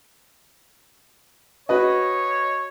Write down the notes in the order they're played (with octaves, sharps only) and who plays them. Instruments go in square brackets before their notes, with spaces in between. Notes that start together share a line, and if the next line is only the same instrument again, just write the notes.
[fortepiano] F#4 B4 D#5 [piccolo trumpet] C#5